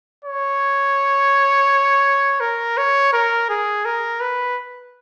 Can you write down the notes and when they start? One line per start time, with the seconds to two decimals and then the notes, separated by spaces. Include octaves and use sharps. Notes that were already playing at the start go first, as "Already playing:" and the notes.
0.25 C#5
2.40 A#4
2.78 C#5
3.13 A#4
3.49 G#4
3.85 A#4
4.21 B4